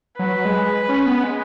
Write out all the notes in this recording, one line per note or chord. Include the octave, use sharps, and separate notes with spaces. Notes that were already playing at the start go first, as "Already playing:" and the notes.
F#3 B4
G#3
C#4
B3
G#3